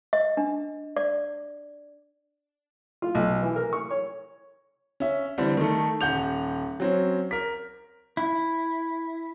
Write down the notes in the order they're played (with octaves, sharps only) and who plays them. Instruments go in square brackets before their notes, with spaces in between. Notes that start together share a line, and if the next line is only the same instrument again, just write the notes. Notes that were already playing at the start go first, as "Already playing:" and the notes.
[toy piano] D#5
D4
D5
[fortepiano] F4
B1
E3
A#4
C#6
C#5
[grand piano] C#4 E5
D3 E3 G3 C4
D#3 A3
D#1 F#5 G6 F7
F#3 C4 C#4
A#4 B6
[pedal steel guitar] E4